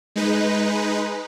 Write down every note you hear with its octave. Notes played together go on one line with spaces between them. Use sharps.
G#3 D#4 B4